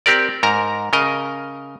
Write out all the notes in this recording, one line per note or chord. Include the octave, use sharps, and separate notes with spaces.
C4 G4 A#4 D5
G#2 A#4 A#5
C#3 A#4 D#5